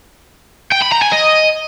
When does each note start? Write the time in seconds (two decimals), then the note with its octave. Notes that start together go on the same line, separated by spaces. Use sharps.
0.72 G5
0.82 B5
0.92 A#5
1.02 G#5
1.12 D#5